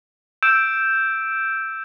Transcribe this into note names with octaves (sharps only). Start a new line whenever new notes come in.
E6 G6 D7 E7